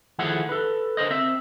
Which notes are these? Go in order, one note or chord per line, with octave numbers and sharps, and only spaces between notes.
D#3 F3 A3 E4 G#4 F#5
A4 B4
D3 A#4 C5 D#5
C4 E5